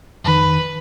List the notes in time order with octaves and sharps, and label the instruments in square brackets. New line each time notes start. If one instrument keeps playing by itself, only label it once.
[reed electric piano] F2 D#3 [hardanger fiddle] B4